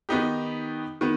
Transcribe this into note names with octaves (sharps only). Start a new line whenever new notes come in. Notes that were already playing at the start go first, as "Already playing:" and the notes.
D#3 B3 D#4 G4
D#3 B3